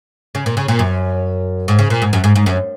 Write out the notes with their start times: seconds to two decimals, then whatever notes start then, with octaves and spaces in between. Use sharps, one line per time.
0.35 C#3
0.46 A#2
0.57 C#3
0.68 A#2
0.79 F#2
1.68 G#2
1.79 C#3
1.90 A#2
2.02 G#2
2.13 F#2
2.24 G#2
2.35 G#2
2.46 F#2